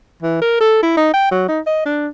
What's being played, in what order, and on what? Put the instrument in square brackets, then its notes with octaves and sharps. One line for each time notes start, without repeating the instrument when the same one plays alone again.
[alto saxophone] E3
A#4
A4
E4
D#4
G5
F#3
D#4
D#5
D4